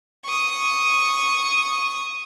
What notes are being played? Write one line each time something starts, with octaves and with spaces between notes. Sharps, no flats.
C#6 D#6